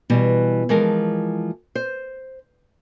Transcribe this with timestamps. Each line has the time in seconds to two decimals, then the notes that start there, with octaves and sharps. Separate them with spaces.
0.10 B2 E3 G3
0.69 E3 F3 G#3 A4 A#4
1.75 C5